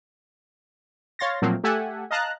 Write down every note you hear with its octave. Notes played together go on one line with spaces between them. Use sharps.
C#5 F5 C6 A6 A#6
A#2 F3 F#3 A3 A#3 C4
A3 G4 A4 E5 F#5 G#5
D#5 F5 A5 A#5 F#6